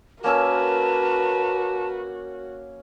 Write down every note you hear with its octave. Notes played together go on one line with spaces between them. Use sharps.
A#3 C#4 F#4 A#4 B4 A5 E6